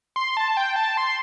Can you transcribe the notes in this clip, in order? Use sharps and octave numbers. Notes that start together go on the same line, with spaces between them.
C6
A5
G5
A5
C6